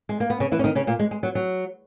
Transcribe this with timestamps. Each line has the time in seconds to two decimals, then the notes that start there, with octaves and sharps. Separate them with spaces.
0.09 G#3
0.20 A#3
0.30 B3
0.40 C#3 C#4
0.52 E3 E4
0.59 C#4
0.64 D#3 D#4
0.75 C#3 C#4
0.87 A#2 A#3
0.99 G#3
1.11 G#3
1.23 F#3
1.35 F#3